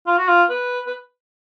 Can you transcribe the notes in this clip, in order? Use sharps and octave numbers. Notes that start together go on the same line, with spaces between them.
F4
F#4
F4
B4
B4